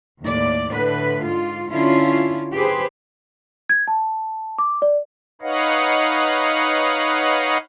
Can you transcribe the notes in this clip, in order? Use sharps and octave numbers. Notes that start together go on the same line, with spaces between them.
D#2 A2 D5
A2 D3 B4
G#2 F4
D3 C#4 E4 F4
G4 G#4 B4 C5
G#6
A5
D6
D5
D#4 B4 C#5 D#5 F5 F#5